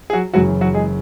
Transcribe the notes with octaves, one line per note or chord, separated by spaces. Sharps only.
G#4
F#3 F#4
F#1 F#2 C#3 E3 F#3 F#4
F#3 F#4
G#3 G#4